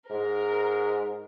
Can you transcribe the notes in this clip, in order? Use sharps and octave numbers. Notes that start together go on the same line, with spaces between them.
G#2 A#4